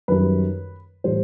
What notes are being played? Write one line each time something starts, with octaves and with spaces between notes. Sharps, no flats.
F#2 D#3 G3 B4
A2 E3 G3 C5